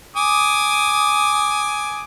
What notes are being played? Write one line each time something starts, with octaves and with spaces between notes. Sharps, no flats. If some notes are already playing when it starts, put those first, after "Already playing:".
G#5 D6 D#6